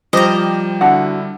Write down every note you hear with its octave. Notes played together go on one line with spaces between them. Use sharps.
F3 G3 G4 C5 D#5 A#5 D6
D3 D4 E4 F#4 F#5